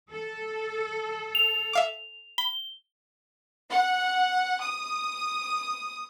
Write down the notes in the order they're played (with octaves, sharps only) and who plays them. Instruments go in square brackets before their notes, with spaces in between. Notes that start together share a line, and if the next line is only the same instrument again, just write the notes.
[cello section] A4
[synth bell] F7
[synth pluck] E5 F5 D6
[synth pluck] B5 [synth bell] G7
[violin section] F#5
D#6